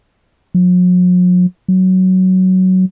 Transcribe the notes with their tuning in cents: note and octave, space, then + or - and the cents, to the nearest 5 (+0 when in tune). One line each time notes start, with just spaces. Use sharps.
F#3 -45
F#3 +10